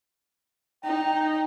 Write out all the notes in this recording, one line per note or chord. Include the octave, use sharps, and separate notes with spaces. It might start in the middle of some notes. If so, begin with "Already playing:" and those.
D#4 G5